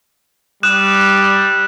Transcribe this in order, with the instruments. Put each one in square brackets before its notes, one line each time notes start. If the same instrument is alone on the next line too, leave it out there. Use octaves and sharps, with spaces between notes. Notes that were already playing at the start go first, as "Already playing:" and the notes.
[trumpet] G3 [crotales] D#6 F#6 E7